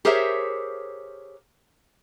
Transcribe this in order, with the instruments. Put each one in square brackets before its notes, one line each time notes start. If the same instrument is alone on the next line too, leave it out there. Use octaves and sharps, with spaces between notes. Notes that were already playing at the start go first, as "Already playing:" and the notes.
[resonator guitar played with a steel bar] G4 G#4 A#4 C5 C#5 E5